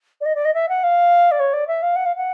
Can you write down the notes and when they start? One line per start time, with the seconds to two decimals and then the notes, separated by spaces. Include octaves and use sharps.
0.20 D5
0.25 D#5
0.35 D5
0.45 D#5
0.54 E5
0.69 F#5
0.83 F5
1.31 D5
1.39 C#5
1.53 D5
1.67 E5
1.82 F5
1.95 F#5
2.05 F5
2.16 F#5